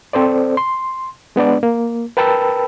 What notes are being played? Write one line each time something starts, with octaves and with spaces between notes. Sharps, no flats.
C4 A4 C5 D5
C6
G#3 B3 D4 D5
A#3
A#4 B4 G5 A5 B5 E6